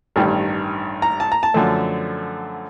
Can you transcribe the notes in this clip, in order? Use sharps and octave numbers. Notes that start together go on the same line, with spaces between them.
A1 G2 D#3
A#5
A5
A#5
A5
F#2 D3 F3 A3